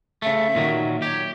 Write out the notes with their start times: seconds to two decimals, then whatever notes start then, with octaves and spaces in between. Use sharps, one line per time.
0.22 C#3 A3 E5
0.55 A#2 D#3 F#3
1.02 G4 C#5